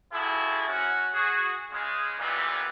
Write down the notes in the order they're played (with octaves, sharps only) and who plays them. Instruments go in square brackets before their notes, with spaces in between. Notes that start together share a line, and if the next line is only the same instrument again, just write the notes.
[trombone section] C3 F3 E4 F#4 G#4 A4
C#4 F#4
F#4 G#4
C#3 G#3
A#1 F2 A#2 E3 G3 B3